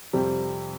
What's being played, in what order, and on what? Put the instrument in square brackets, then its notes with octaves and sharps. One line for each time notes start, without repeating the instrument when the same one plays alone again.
[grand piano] F2 C3 G3